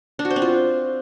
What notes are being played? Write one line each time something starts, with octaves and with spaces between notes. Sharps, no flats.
D4
F#4
C5
C4
F4